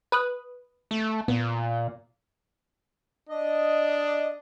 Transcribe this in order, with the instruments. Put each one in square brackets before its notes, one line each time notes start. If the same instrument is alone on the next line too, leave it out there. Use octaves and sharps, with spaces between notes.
[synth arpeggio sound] B4 D#6 F#6
[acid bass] A3
[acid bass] A#2 [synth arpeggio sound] B3
[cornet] D4 [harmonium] D#5